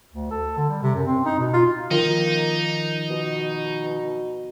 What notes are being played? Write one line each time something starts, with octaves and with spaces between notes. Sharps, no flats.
D2
A4
D3
G3
C3
F#2
C4
D#4
B2
F4
D#3 F3 A#3 D#4
B2